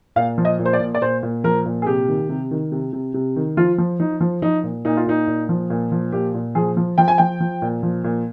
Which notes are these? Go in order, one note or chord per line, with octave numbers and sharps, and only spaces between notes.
A#2 F5
F3
D#5
A#2
C5
D5
A#2
D5
A#2 C5
A#2
F3 A#4
A#2
G#4
C3 G4
D#3
C3
D#3
C3
C3
C3
D#3
F3 F4
F3
F3 D#4
F3
F3 D#4
A#2
A#2 D#4
F4
A#2 D#4
A#2
F3
A#2
F3
A#2 G4
A#2
F3 G#4
F3
F3 G5
G#5
F3 G5
F3
A#2
F3
A#2